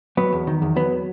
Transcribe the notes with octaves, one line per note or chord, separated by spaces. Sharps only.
F#3 B3
E2
D#3
E2
F#3 B3